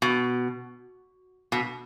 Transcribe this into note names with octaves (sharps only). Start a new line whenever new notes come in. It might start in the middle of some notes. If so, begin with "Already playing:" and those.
B2
B2